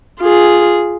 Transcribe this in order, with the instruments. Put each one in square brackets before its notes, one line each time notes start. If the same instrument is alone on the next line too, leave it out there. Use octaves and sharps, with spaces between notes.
[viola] F4 G#4